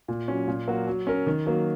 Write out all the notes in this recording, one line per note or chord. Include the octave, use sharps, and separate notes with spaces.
A#2
F#3 C#4
A#2
F#3 A#3 F#4
F#3
C#4 A#4
D#3
F#3 A#3